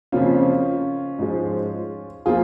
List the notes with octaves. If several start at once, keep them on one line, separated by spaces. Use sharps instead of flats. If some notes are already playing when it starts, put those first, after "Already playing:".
F2 C#3 F3 A#3 C#4 F4
G#2 F3 G#3
F3 A#3 F4 G#4